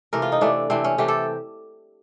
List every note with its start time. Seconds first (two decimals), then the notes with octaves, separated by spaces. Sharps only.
0.13 C3 E3 A3 A#4
0.22 F4
0.32 D#4
0.41 C3 E3 A3 D4
0.70 C3 E3 A3 C4
0.84 C#4
0.98 C3 E3 A3 G4
1.08 A4